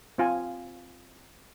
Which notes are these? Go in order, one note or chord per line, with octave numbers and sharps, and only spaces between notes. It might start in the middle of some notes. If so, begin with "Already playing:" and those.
C4 F4 G#5